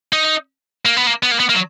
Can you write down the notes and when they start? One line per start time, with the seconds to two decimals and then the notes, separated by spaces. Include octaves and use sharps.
0.13 D#4
0.85 A#3
0.97 B3
1.07 A#3
1.23 B3
1.31 A#3
1.40 B3
1.49 A#3
1.54 F#3